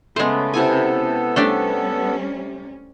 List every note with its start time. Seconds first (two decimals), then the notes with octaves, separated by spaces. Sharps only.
0.16 C#3 G#3 A3 B3 C5
0.54 C3 B3 E4 A4 G#5
1.36 G3 A3 C#4 D4 G4